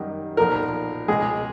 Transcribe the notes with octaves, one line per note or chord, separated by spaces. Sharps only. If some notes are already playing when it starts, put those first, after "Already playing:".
Already playing: F#2 D#3 G3
B1 A#2 F3 A#4
C#2 B2 G#3 G#4